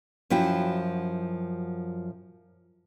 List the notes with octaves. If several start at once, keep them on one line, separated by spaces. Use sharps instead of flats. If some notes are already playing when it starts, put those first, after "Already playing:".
F#2 F3 E4 F#4 G5